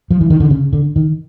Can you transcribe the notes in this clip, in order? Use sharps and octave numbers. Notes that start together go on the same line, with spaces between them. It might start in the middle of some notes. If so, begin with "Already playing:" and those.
F3
E3
D#3
D3
C#3
D3
D#3